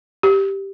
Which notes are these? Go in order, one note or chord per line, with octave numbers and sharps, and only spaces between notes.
G4